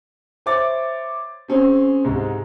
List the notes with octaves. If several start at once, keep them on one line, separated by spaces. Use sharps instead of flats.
C5 C#5 E5 D6 A6
C4 C#4 G#4 C5
C2 G#2 G#3